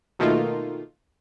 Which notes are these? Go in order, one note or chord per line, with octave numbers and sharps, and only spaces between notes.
B2 D#3 A3 A#3 D#4 F4